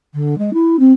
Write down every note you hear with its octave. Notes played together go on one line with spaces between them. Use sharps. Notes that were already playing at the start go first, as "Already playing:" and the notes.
D3
G#3
E4
C4